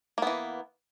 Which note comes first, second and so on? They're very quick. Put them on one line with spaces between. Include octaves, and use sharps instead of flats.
A#3 B3 E3